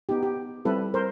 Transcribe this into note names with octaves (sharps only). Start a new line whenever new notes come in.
B3 D#4 G4
G4
G3 C4 E4 G4 A4 B4
A#4 C5